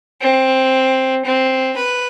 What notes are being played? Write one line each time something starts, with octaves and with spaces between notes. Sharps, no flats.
C4
C4
B4